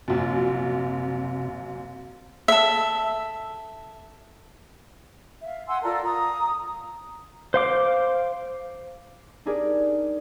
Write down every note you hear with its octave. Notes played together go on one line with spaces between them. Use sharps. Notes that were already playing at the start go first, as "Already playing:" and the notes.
A#1 F#2 C3
A4 E5
E5 F5
F#5 G#5 C6 E6
F4 A4 A#4 D5
A#5 D#6
C5 F5 D6
D4 D#4 G4 G#4 A#4 D5